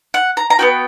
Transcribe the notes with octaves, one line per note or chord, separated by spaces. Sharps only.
F#5
A#5
A#5
B3 D4 F#4 G5